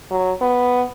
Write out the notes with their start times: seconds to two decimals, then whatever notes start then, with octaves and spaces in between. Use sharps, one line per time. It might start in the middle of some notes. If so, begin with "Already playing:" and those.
0.11 F#3
0.42 B3